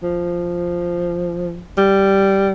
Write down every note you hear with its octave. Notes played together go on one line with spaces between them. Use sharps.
F3
G3